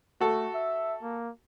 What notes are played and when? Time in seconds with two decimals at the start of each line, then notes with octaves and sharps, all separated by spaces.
0.21 A3 F#4 A4
0.54 E5
1.02 A#3